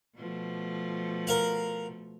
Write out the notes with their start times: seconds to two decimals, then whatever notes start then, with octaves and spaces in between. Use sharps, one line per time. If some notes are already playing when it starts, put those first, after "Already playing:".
0.17 B2 F3 A3
1.27 A#4 F5 F#5